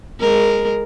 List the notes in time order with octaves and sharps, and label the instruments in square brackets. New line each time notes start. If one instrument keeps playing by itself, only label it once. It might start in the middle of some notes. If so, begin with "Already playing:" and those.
[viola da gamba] G#3 A#4